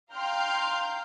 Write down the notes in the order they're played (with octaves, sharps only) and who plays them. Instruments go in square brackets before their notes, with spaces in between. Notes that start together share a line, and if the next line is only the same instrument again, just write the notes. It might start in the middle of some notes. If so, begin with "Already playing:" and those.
[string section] F5 G5 A#5 C6 F6 G6